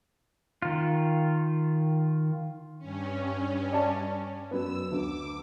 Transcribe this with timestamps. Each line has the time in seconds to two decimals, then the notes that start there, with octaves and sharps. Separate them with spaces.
0.62 D#3 F4
2.79 G2 C#4
3.72 D5 A5
4.51 F#2 B3 E6
4.91 D2 D6